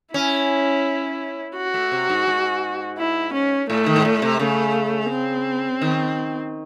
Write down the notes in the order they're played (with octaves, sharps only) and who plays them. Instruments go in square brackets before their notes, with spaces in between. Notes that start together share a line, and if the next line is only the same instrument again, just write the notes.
[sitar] C#4 [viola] E4
[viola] F#4
[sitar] A3
C3
G#2
G#2
[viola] E4
C#4
[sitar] A2 [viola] A3
[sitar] D#3
G#2
A2
C3
[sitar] C#3 [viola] A3
[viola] C4
[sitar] D#3